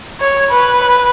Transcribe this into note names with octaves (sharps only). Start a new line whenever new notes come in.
C#5
B4